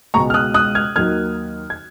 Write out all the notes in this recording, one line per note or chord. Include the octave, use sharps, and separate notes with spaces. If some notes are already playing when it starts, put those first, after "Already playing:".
C#2 B2 G#3 A#5 C#6
F6
D#6 F#6
D#6 F#6
F6 G#6
D#2 D#3 F#3 A#3 F6 G#6
G#6